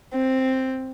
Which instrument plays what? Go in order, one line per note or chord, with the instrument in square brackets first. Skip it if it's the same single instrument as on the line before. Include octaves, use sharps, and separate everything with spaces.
[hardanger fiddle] C4